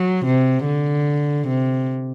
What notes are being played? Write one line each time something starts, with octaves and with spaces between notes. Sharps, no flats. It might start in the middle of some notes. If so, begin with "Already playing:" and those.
Already playing: F#3
C3
D3
C3